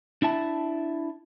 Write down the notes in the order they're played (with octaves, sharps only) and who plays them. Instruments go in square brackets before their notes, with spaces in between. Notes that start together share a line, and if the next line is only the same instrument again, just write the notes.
[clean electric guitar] D4 E4 E5 A5